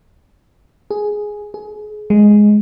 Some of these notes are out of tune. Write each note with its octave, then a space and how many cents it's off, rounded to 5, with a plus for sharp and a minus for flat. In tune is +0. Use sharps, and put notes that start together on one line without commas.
G#4 +5
G#4 +25
G#3 +0